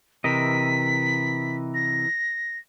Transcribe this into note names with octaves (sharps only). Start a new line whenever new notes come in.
C3 E3 A#4 D#5 B6
A#6